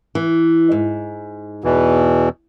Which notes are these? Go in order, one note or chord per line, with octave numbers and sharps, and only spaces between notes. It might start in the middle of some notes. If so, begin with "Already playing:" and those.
E3
G#2
E2 B2 E3